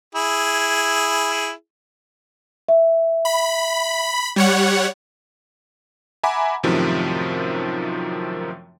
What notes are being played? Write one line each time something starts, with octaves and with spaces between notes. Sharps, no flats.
E4 G#4
E5
B5
G3 C#5 F#5
E5 F#5 G#5 A#5 B5 D6
F#2 A2 C3 D#3 F3